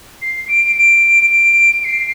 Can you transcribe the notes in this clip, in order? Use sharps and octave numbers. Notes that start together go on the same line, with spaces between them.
C7
D7
D7
D7
C7